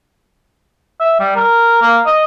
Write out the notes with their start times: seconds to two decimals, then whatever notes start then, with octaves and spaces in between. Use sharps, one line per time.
1.01 E5
1.20 G3
1.36 A#4
1.82 A#3
2.06 D#5